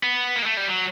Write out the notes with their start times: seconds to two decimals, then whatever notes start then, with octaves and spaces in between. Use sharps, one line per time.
0.03 B3
0.36 A#3
0.42 G#3
0.46 A3
0.57 G3
0.68 F#3